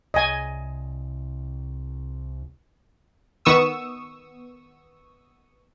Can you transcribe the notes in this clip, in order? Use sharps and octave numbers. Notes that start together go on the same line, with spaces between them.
C2 D#5 G#5
D#3 B3 C#6 D#6 E6